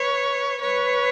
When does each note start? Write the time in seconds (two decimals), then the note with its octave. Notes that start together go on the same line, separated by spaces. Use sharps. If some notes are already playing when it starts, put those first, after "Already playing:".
Already playing: B4 C#5
0.61 B4 C#5